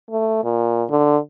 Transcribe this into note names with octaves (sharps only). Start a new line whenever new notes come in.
A3
A#2
D3